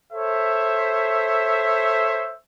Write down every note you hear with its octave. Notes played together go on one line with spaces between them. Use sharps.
A4 C5 C#5 E5